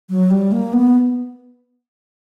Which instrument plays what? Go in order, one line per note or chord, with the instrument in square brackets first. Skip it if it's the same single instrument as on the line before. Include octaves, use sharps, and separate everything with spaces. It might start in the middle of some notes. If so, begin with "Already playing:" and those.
[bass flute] F#3
G3
A#3
B3